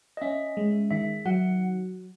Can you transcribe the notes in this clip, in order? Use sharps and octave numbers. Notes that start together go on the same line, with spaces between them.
D#5
C#4 E5
G#3
D#3 E5
F#3 F#5